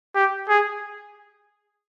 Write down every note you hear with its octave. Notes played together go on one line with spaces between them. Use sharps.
G4
G#4